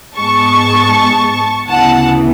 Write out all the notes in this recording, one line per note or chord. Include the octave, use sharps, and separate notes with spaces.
G#2 G#3 B3 A5 C#6
D2 C#3 E3 B3 F#5 A5